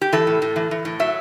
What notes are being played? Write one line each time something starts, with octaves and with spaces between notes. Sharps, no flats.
G4
E3 A4
A2
A2
E3
E3
A2
F#3 E5